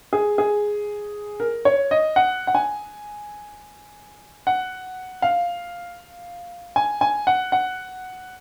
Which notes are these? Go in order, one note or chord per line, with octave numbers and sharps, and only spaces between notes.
G#4
G#4
A#4
C#5
D#5
F#5
F#5
G#5
F#5
F5
G#5
G#5
F#5
F#5